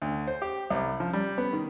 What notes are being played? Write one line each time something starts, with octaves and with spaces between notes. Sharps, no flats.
D2
C5
G4
C2
F3
G3
B3
D#3